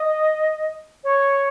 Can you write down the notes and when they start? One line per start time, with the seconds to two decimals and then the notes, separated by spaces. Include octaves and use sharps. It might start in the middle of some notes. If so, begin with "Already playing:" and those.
Already playing: D#5
1.03 C#5